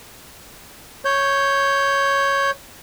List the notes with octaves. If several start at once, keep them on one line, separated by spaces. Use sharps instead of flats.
C#5 G6